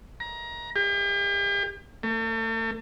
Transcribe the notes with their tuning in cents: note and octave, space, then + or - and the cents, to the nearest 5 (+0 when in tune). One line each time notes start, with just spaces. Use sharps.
A#5 +25
G4 +40
A3 +45